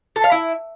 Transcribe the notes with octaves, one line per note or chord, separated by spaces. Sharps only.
A4
F5
E4